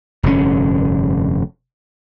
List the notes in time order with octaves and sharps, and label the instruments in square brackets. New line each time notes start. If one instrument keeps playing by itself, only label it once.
[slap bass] F1 G2 D3 C#4